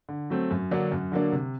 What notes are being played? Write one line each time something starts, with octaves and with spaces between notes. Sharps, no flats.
D3
F#3 A3 C4
F#2
D3 F#3 A#3 D4
F#2
D3 F#3 A#3 D4
C3